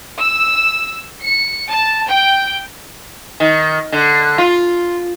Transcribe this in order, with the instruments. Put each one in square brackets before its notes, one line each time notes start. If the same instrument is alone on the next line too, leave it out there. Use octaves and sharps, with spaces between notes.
[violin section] E6
C#7
A5
G5
[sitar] D#3
D3
F4